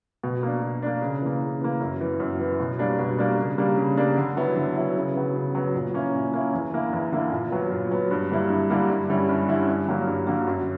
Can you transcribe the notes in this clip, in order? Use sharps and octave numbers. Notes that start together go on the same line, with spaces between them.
B2
A#3 D4
B2
A#3 D4
C#3
E3 A#3
C#3
E3 A#3
F#2
E3 B3
F#2
E3 B3
B2
G3 A#3 D4
B2
G3 A#3 D4
C#3
G3 A#3 D4
C#3
G3 A#3 D4
D3
F#3 B3 E4
D3
F#3 B3 E4
C#3
F#3 B3
C#3
F#3 B3
A#2
A#3 C#4 E4
A#2
A#3 C#4 E4
E2
D3 A#3 E4
E2
D3 A#3 E4
A#2
F#3 B3
A#2
F#3 B3
G2
D3 G3 A#3 E4
G2
D3 G3 A#3 E4
G2
D3 G3 C#4 E4
G2
D3 G3 C#4 E4
G2
D3 F#3 A#3
G2
D3 F#3 A#3
F#2